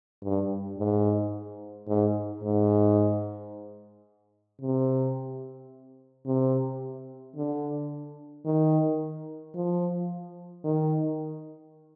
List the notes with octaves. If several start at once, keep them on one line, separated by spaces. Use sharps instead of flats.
G2
G#2
G#2
G#2
C3
C3
D3
D#3
F3
D#3